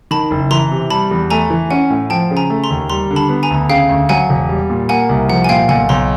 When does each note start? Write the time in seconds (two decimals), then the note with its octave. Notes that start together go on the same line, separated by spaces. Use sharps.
0.11 D#3 A5 B5
0.31 F#1
0.51 E3 A#5 C6
0.71 C3
0.90 G3 A5 B5
1.11 E2
1.30 A3 G#5 A#5
1.50 E3
1.70 C#4 F#5 G#5
1.90 A2
2.10 F3 G5 A5
2.31 C#3
2.37 G#5 A#5
2.50 A3
2.64 A#5 C6
2.70 D#2
2.90 G3 A#5 C6
3.11 D3
3.16 A5 B5
3.29 B3
3.43 G#5 A#5
3.50 D2
3.69 C#3 F5 G5
3.89 D2
4.09 F#3 F#5 G#5
4.29 E1
4.49 G3
4.70 A#2
4.89 A#3 F#5 G#5
5.09 C2
5.29 F3 F#5
5.44 G#5
5.49 A#2 F5 G5
5.68 B1 F#5 G#5
5.89 B1 A#5 C6